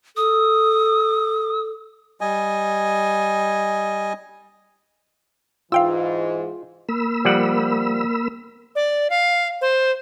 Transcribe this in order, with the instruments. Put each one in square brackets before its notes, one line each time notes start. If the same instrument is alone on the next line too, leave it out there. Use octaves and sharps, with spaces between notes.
[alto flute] A4 [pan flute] D#6
[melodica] G3 D#5 G#5
[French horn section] G#2 E3 [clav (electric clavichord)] F4 [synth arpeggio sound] F5 G5 E6
[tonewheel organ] A#3 B5 E6
[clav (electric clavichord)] F3 G3 F#5
[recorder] D5
F5
C5